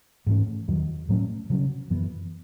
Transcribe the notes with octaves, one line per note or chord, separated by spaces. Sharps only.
G#2 E3 A3 C#4
E2 D#3 F#3
A2 F#3 A3 C#4
C#3 F#3 C#4
F#2 E3 B3